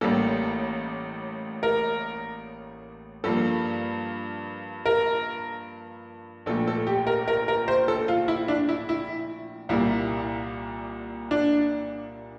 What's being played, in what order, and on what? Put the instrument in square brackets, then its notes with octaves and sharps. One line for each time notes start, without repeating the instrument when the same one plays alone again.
[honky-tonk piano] A1 A2 G3 A#3 A4
A#4
G2 F3 A#3 A4
A#4
A#1 A#2 A3 A4
A4
G4
A#4
A#4
A#4
C5
A4
F4
E4
D4
E4
E4
C2 A#2 G3 A#3 E4
D4